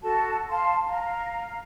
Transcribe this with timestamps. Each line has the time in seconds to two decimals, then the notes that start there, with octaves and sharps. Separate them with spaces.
0.03 F#4 A4 A5
0.49 F5 A5 C6
0.87 F5 A#5